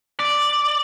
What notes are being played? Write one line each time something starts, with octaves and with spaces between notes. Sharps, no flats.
D5